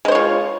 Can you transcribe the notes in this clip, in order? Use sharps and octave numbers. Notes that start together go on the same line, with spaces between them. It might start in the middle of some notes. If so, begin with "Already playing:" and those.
G#3 F4 C5 C#5